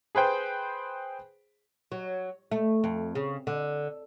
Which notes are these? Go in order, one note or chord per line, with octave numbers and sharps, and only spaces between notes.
G#4 B4 C5 G5
F#3
A3
F2
C#3
D3